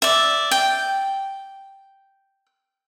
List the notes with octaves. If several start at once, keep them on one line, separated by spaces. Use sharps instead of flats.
D5 E5
G5